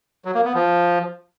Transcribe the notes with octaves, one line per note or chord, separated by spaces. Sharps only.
F#3
A#3
B3
F3